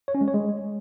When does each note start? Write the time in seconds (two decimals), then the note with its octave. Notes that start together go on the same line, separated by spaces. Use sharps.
0.08 C#5
0.15 C#4
0.21 G#3
0.28 C#5
0.34 G#3